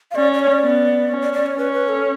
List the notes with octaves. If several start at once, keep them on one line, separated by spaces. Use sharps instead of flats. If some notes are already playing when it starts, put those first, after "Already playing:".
F5
C#4 D5
D5
C#5
D5
B3
C#4
D5
D5
C#5
C#4 B4
B4
A4